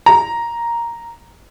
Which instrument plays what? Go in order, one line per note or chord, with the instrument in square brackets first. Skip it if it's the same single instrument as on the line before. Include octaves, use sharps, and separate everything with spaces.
[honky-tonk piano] A#5